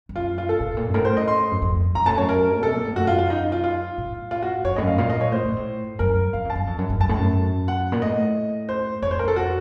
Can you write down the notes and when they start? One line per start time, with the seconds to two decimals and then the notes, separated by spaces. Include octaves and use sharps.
0.09 F#2
0.16 F4
0.38 F4
0.49 A4
0.60 A2
0.77 A#2
0.88 F#2
0.94 A2 A#4
1.05 C5
1.17 D#5
1.28 C6
1.51 F#2
1.62 F2
1.95 F#2 A#5
2.06 A2 A5
2.18 F#2 C#5
2.29 A#4
2.60 C3 A4
2.73 A#2
2.84 A2
2.96 F#2 F#4
3.07 F4
3.19 F4
3.30 D#4
3.52 F4
3.64 F4
3.98 A2
4.31 F4
4.42 F#4
4.64 F#2 C#5
4.76 A2 D#5
4.82 F#2
4.87 F5
4.98 A#2 F5
5.10 D#5
5.21 C#5
5.32 A2 C5
5.45 A#2
5.57 A2
5.99 F#2 A#4
6.33 F#2 F5
6.45 F2
6.50 A5
6.55 F#2
6.67 F2
6.78 F#2
6.90 F#2
7.00 F#2 A5
7.09 A2
7.19 F#2
7.68 F#5
7.92 A#2
8.02 A2 D#5
8.69 C5
9.02 F2 C#5
9.11 C5
9.19 A#4
9.25 F2 A4
9.36 F#4